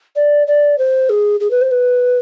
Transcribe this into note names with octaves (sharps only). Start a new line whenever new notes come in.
D5
D5
C5
G#4
G#4
B4
C5
B4